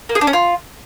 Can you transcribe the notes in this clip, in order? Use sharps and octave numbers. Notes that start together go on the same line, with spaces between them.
A#3
G#4
D4
C#4
F4